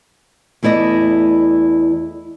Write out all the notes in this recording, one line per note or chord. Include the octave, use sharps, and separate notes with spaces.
E2 A3 E4 D5 D#5